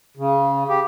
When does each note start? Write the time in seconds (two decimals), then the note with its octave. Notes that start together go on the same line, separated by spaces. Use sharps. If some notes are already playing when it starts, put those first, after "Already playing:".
0.17 C#3
0.69 G4